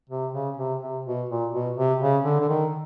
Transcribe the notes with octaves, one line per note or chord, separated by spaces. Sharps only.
C3
C#3
C3
C3
B2
A#2
B2
C3
C#3
D3
D3
D#3